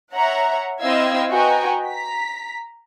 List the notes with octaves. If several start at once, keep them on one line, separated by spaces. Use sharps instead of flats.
C#5 E5 F#5 A#5
C4 E4 D#5 F5 E6 G#6
F#4 B4 D#5 G5 G#5 A#5
A#5 B6